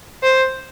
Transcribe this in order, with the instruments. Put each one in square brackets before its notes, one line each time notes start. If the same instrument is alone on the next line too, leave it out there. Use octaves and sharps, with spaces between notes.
[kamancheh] C5